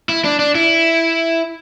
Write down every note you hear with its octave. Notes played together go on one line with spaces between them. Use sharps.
E4
D4
D4
E4